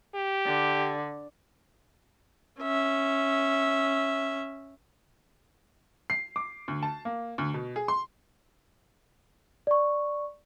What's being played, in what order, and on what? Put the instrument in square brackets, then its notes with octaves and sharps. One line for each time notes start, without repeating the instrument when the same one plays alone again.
[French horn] G4
[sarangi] D3
[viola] C#4 E5
[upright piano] C7
D6
D2
A5
A#3
D2
B2
G#4
C6
[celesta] D5 C#6